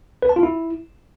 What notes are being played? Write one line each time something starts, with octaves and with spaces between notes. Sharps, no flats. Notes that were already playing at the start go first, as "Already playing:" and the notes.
B4
A5
F4
E4